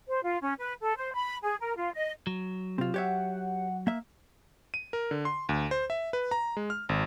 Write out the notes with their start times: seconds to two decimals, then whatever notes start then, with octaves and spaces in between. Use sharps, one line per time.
0.08 C5
0.23 F4
0.41 C#4
0.59 B4
0.81 A4
0.96 C5
1.13 B5
1.42 G#4
1.60 A#4
1.77 F4
1.94 D#5
2.27 F#3
2.78 C3 C4 F4
2.94 G4 C#5 E5 F#5
3.87 A#3 E5
4.74 D#7
4.93 A#4
5.11 D3
5.25 C6
5.49 D2
5.71 C5
5.90 E5
6.13 B4
6.31 A#5
6.57 G#3
6.70 F6
6.89 G#1